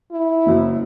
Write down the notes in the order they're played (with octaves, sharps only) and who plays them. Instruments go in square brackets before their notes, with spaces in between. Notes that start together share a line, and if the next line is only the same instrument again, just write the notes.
[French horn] E4
[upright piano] F#1 F#2